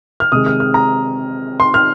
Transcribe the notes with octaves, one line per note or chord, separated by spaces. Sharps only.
F6
C3 D#3 G#3 D#6
F6
F6
A#5
C6
F6